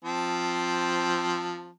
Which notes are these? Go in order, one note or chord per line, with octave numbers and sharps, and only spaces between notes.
F3 C4 A5